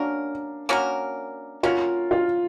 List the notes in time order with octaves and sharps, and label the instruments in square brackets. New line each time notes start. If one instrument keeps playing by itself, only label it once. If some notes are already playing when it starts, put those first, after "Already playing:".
Already playing: [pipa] A#3 C#4 F#4 A#4 [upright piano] D4
[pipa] A#3 C#4 F#4 A#4
[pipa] A#3 C#4 F#4 A#4 [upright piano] F4
[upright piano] F4